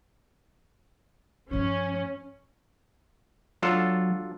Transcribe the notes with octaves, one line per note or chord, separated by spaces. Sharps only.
G2 F3 C#4
F#3 D4 F4 A4